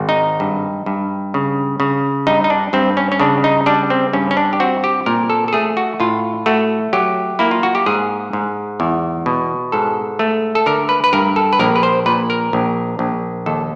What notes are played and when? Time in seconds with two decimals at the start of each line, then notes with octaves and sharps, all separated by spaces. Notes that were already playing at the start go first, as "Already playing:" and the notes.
Already playing: G#1
0.09 D#4
0.40 G2
0.86 G2
1.34 C#3
1.80 C#3
2.27 G2 D#4
2.44 D#4
2.50 D4
2.73 G2 C4
2.97 C#4
3.12 C#4
3.20 C#3 D4
3.44 D#4
3.66 G3 D4
3.90 C4
4.13 G2 C#4
4.31 C#4
4.37 D4
4.53 G4
4.60 C4 F#4
4.84 G4
5.06 A#2 A#4
5.30 A4
5.48 A4
5.53 A3 G#4
5.77 F#4
6.00 A2 F4
6.46 A3 F#4
6.93 F#3 G4
7.39 A#3 E4
7.51 F4
7.63 F#4
7.75 G4
7.86 G#2 G#4
8.33 G#2
8.80 E2
9.26 B2
9.72 G#2 A4
10.19 A3
10.55 A4
10.66 D3 A#4
10.89 B4
11.04 B4
11.13 G2 A#4
11.36 A4
11.53 B4
11.59 A#1 A#4
11.76 B4
11.83 C5
12.06 A#2 B4
12.30 A#4
12.53 A#1
12.99 A#1
13.46 D#2 A4